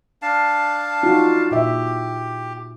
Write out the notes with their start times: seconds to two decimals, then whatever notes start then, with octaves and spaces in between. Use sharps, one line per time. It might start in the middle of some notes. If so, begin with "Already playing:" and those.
0.22 D4 F5 A5
1.03 D#4 F4 F#4
1.51 A#2 G4 E5